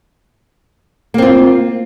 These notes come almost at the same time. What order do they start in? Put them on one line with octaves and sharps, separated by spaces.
A#3 C4 F4